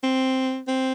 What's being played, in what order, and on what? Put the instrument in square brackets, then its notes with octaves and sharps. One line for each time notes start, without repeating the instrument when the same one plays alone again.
[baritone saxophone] C4
C4